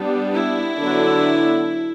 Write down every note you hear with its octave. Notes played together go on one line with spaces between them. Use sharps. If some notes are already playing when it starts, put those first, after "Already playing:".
Already playing: G3 B3 D4
E4
D3 F#3 B3 D4